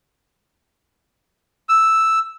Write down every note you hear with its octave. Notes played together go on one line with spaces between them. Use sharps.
E6